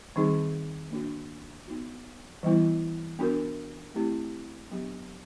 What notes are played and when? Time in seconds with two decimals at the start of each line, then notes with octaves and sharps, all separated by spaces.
0.16 D#3 G3 C4 D#4 G#4
0.91 A#3 D4 F#4
1.68 B3 D#4 F#4
2.43 E3 G3 B3 E4
3.19 B3 D4 F#4 A#4
3.95 A3 C4 E4 G4
4.71 F#3 B3 D4 G4